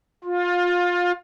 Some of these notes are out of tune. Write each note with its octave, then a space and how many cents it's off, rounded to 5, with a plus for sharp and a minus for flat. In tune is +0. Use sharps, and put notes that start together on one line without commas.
F4 +20